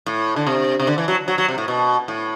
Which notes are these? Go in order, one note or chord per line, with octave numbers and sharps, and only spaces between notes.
A2
D3
C3
C3
D3
E3
F#3
F#3
F#3
C3
A2
B2
A2